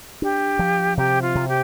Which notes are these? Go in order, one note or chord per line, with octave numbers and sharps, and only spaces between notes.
D4 G4
F3
C3 G4
F4
C3
G4